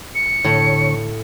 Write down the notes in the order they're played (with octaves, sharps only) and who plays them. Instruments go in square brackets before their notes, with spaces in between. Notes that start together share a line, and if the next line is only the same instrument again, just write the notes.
[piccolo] C#7
[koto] A2 [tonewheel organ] D3 C#5